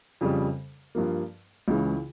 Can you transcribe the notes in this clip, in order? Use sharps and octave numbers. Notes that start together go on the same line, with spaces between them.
F2 C#3 G3
G2 F3 A#3
C#2 C#3 E3